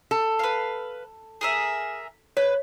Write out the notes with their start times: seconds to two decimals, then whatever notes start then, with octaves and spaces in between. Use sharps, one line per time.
0.11 A4
0.39 B4 F5
1.41 G#4 A#4 E5
2.37 B4 C#5